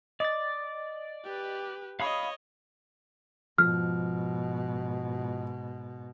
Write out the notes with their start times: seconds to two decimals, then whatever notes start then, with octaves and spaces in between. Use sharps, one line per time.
0.20 D5 D#5 A6
1.24 G4 B4
2.00 C#5 D#5 F5 B5 D#6
3.58 G#2 B2 F3 F6